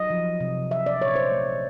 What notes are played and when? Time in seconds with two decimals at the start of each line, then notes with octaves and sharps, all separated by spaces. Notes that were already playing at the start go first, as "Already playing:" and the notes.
Already playing: F#3 D#5
0.10 F3
0.40 C3
0.71 F3 E5
0.86 D5
1.01 A#2 C#5
1.16 C5
1.31 A3